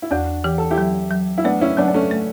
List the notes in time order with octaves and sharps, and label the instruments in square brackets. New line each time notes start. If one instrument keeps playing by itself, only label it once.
[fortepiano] E4
[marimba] E2 [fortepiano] D4 F#4
[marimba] E3 [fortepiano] G4
[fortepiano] A4
E4 G4
[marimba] F#3
F#3
[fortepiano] E4
[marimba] A3 [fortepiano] B3 D4
[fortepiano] C#4 E4
[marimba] F#3 [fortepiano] B3 D4
[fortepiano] D4
A3 C#4
[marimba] A3